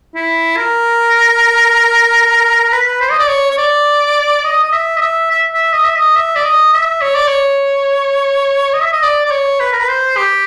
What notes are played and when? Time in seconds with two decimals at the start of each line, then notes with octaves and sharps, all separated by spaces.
0.15 E4
0.57 A#4
2.72 B4
3.01 C5
3.11 D#5
3.20 D5
3.29 C#5
3.51 C#5
3.58 D5
4.44 D#5
4.64 D#5
4.73 E5
4.97 D#5
5.01 E5
5.31 E5
5.54 E5
5.73 D#5
5.84 E5
5.96 D#5
6.16 E5
6.36 D5
6.45 D#5
6.74 E5
7.02 C#5
7.15 D5
7.28 C#5
8.74 D#5
8.83 E5
8.93 D#5
9.03 D5
9.26 D5
9.31 C#5
9.60 B4
9.72 A#4
9.80 B4
9.89 C5
10.17 G4